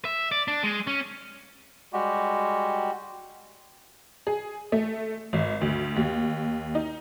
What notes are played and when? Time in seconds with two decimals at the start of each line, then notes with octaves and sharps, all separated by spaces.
0.05 E5
0.32 D5
0.48 D4
0.64 G#3
0.87 C#4
1.93 G3 G#3 F#4 G4
4.27 G#4
4.72 A3
5.33 G#1
5.61 D2
5.96 D#2
6.75 D#4